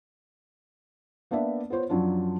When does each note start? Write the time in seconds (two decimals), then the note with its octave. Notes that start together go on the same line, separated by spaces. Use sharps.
1.31 A#3 B3 D4 D5 E5
1.70 B3 F4 C5 C#5
1.89 F#2 F3 F#3 D4 F4